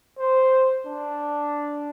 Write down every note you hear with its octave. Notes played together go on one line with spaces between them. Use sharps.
C5
D4